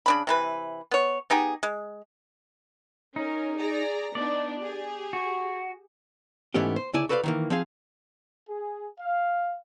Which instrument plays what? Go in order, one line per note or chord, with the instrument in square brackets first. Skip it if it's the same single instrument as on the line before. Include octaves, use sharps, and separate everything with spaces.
[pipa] C#3 D4 B5
C3 E3 B4
B3 C#5
B3 D#4 G4 G#4
G#3
[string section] C#4 A#4 [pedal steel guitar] D#4
[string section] G#4 D5 A#5
[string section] B3 D4 D#4 [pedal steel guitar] D5
[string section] G4 G#4
[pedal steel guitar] F#4
[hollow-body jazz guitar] G#2 E3 A3 B3 C#4 G4
C5
D2 C#3 E4 D5 G#5
F#4 A4 B4 C5 D5 F5
D#3 E3 A#3
F3 C4 G4 G#4 F5
[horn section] G#4
F5